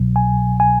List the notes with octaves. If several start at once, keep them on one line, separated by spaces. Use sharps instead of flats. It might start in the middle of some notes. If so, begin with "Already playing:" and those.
Already playing: C2 B2 F#3
G#5
G#5